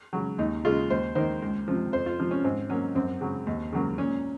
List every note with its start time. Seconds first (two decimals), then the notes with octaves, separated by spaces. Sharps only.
0.13 C#3 F#3
0.38 D#2 D#4
0.65 C#3 G#3 F4
0.90 D#2 C5
1.15 D#3 A#3 C5
1.42 C#2
1.68 C3 F3
1.92 F2 C5
2.06 F4
2.19 C3 F3
2.31 C#4
2.44 G#2 C4
2.70 F#3 A#3 C#4
2.95 F#2 C4
3.21 C#3 F#3
3.47 D#2
3.73 C#3 F#3 A#3
3.98 A#2 C#4